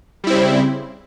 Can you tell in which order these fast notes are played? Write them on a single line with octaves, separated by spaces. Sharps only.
G3 E4 C4 C#3